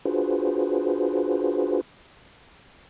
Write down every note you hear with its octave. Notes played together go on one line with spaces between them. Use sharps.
D4 F4 F#4 G#4 B4 C5